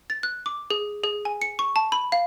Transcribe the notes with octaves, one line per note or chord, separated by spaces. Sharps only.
A6
F#6
D6
G#4
G#4
G#5
C#7
C#6
A5
B5
F5